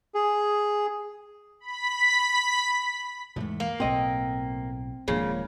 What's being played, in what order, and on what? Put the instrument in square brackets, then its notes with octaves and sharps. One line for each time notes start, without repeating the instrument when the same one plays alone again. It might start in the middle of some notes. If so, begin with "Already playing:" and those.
[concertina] G#4
[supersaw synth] B5 B6
[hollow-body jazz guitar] B1 E2 [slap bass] G#2 A3
[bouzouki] A#3
[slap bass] B1 A2 [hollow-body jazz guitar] C4 D#5 [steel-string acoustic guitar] G5
[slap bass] D#1 G#2 D4 [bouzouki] C#3 [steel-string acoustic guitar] F3 A#3 C#5